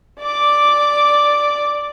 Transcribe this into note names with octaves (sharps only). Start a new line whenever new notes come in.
D5 D6